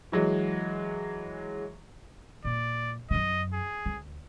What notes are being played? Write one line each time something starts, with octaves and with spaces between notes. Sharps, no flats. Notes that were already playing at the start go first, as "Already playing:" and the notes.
E3 F#3 G#3
A#2 D5
F#2 C#3 D#5
G#4
D2